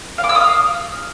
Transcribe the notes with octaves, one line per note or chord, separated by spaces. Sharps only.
F5
D6
E6
D#6
F5